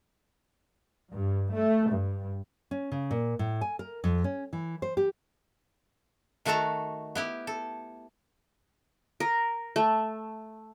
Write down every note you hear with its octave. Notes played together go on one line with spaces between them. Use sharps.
G2
A3
G2
C#4
C#3
A#2
A2
G#5
A#4
F2
C#4
E3
C5
G4
D#3 A3 F#4 A4 A5 A#5
B3 E4 G4
A4
A#4
A3